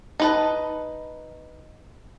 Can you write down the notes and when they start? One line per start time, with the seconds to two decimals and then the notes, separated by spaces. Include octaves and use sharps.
0.20 D#4 B4 A5